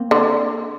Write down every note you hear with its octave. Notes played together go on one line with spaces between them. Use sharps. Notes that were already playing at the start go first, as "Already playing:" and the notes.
Already playing: A#3 C4
D3